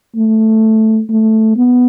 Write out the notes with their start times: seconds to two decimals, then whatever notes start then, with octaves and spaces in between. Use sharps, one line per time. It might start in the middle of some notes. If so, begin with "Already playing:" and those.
0.16 A3
1.10 A3
1.57 B3